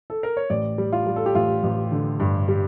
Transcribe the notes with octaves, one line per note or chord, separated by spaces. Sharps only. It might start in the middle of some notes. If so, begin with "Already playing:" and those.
A4
A#4
C#5
A1 D5
G3
F4
G3
A4
G4
A1 F4
A1
D3
G2
G3